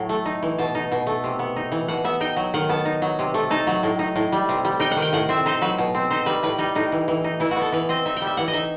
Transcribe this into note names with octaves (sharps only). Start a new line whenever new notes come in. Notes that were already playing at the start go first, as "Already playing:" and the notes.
Already playing: A2 F#3
A3
D#4
E3
B2 A5
D#4
B2
A3
C3
B3
D#4
E3
B2 F#5
B3 E5
D#4 G5
F#3
D#3 F#5
B3 A5
D#4
F#3
C3
A3
D#4 A5
F#3
A2
D#4
A2
G3
C3
G3
D#4 G5
F#5
D#3
G5
A2 F#5
C4 E5
D#4 C5
F#3 B4
B2
C4
D#4 C5
G3 B4
A2 B4
G3 D#4
A2 D#4
E3
E3
D#4
E3 E4
F#4
B3 A4
E3 B4
C4 D#5
D#4 E5
G5
G3
E5
E3 F#5
D#5
D#4 E5